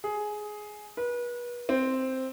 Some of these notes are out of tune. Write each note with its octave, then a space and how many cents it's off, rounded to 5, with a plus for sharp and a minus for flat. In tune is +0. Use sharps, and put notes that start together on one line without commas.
G#4 +10
B4 -35
C4 +0